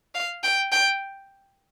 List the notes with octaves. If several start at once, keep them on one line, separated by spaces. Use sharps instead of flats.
F5
G5
G5